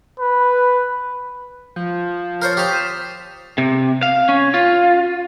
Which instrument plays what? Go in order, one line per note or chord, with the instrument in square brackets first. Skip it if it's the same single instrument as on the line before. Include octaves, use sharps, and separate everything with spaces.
[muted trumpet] B4
[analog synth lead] F3 [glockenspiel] G6
[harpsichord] A#4 C5 C#5 [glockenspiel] F6 G6 A6
[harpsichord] G4 C5 [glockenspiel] C#6 D#6 F7
[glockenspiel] B6 D#7 E7
[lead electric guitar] C3
F5
C#4
F4